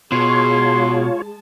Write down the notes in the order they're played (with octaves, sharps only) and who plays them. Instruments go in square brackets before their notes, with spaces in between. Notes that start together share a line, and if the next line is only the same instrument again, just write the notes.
[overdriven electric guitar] B2 [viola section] G#3 G#4 A5 [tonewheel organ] F4 C#5 [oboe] C6